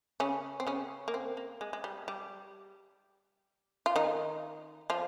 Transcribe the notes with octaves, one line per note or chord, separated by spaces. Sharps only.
C#3 C#4
C4
C#3 C#4
A#3
C4
A#3
G#3
G#3
G3
G3
F4
D#3 D#4
F3 F4